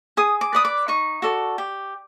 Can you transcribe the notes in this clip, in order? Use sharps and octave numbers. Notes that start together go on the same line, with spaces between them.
G#4 D#6
D6
B4 D5 D#6
D6
D#4 C#6
F#4 A4 D5
G4